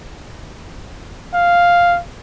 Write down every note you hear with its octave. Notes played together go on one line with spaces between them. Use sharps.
F5